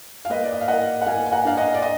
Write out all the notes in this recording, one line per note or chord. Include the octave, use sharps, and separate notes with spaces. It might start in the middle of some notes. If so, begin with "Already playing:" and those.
F5
A#3 B4 D#5
D5
D#5
F5
A#3 D#5 F#5
F#5
A#3 F5 G#5
G#5
F#5 A#5
D4 F5
D#5 F#5
D5
D#5